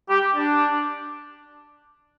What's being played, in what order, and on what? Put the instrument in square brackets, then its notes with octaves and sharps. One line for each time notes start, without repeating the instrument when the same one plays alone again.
[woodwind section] G4
D4